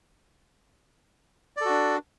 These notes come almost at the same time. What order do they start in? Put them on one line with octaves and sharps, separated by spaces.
D5 A4 F#4 D4